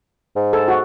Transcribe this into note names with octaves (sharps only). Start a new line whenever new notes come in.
G#2
A4
F#4